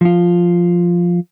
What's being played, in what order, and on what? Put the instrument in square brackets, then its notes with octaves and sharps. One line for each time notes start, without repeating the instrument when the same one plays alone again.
[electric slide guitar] F3 F4